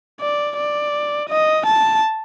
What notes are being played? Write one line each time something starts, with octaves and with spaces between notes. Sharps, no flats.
D5
D5
D#5
A5